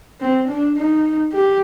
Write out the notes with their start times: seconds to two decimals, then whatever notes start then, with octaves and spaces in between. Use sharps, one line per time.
0.20 C4
0.48 D4
0.77 D#4
1.33 G4